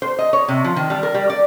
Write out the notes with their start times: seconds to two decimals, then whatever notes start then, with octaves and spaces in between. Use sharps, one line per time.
0.02 C5
0.19 D#5
0.33 C#5
0.48 C3
0.64 F3
0.76 D#3
0.90 G3
1.03 A#4
1.14 G3
1.30 D5